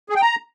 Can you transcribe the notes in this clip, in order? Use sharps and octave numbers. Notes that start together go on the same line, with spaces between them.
G#4
G5
A#5